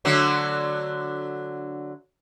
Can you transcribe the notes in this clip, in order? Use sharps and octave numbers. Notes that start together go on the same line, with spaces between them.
D3 F#3 A3